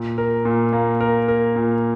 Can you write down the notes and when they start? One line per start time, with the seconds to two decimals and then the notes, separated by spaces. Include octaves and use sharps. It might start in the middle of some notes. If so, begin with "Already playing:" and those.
Already playing: A#2
0.18 A#4
0.45 A#2
0.73 A#3
1.01 A#4
1.28 A#4
1.56 A#2